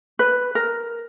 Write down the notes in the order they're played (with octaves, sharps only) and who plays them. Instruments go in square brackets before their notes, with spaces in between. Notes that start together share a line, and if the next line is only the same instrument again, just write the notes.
[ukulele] B4
A#4